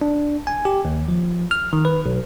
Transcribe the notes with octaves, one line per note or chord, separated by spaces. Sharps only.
D4
G#5
G4
D#2
F3
F6
D#3
B4
B1